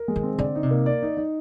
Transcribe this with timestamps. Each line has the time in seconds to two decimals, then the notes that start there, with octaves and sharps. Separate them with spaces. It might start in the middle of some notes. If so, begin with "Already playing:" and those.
Already playing: A#4
0.08 G#3
0.16 D#3
0.23 C4
0.39 D3 D5
0.55 D#4
0.63 C3
0.71 A#3
0.86 D5
1.02 D#4
1.17 D#4